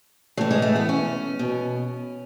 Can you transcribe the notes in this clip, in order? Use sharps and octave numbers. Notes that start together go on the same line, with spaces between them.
A2 E3 F#3
G#3
A3
B3
C#4
B2